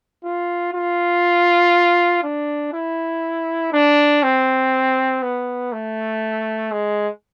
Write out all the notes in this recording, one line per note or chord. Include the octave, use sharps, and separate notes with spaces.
F4
F4
D4
E4
D4
C4
B3
A3
G#3